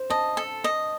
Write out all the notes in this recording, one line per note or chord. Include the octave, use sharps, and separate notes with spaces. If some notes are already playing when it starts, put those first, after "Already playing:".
Already playing: C5
D#5 A5
A4
D#5